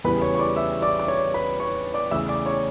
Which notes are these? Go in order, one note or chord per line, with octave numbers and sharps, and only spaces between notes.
E2 C#3 E3 G3 B3 B4 B5
C#5 C#6
C#6
D5 D6
E5 E6
D5 D6
D6
C#5 C#6
B4 B5
C#5 C#6
D5 D6
E2 C#3 E3 A3 E5 E6
D5 D6
C#5 C#6